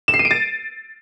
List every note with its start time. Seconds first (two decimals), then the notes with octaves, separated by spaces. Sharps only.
0.08 E7
0.14 C7
0.19 D#7
0.25 D7
0.31 A6